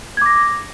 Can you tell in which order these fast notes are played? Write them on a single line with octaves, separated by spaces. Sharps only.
G#6 D6 A#6